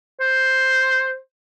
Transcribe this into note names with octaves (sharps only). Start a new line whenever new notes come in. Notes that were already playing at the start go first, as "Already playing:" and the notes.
C5